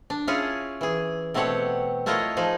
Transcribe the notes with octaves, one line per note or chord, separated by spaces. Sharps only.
D4
C#4 E4 F4 G#4 C#5
E3 G#4
B2 A3 C4 G4 C#5 F#5
A3 E4 F4 A#4 C#5 D#5
F3 D#4 G#4